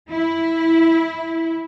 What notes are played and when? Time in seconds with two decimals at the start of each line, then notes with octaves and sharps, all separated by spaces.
0.09 E4